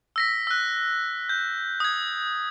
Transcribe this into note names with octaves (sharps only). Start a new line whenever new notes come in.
E6 A#6 B6
E6 F#6
G6
D#6 G#6